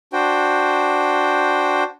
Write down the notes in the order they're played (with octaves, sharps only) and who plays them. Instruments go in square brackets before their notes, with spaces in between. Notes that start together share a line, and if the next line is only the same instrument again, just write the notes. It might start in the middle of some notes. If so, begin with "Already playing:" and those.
[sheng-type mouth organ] D4 F#4 C5 G5